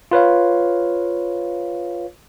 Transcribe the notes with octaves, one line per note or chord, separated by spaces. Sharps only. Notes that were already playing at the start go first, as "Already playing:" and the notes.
F4 B4 C#5 F5